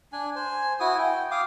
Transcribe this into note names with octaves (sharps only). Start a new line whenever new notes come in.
D4 G#5
C5 G#5
E4 F#4 G#5 D#6
G5
F5 D6 D#6